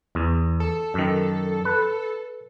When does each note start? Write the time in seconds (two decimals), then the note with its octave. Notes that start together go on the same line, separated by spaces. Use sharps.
0.15 E2
0.60 A4
0.94 F#2 D#3
1.65 B4